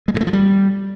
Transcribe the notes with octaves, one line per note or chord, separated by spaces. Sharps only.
G#3
G2
A3
F3
G3